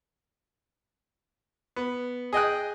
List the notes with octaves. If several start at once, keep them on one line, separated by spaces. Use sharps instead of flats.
B3
G#4 D#5 G5 F#6